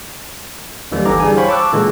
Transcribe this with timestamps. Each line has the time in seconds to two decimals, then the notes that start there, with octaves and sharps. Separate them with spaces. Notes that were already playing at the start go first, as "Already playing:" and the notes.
0.92 D#2 D3 E3 G3
1.05 G1 D3 E3 A#5 D6
1.20 G3 G#4 G#5
1.36 C5 C#5 F5 G5 B5 C#6
1.49 A5 C#6 D6 E6 F#6
1.72 A#2 D3 E3 G#3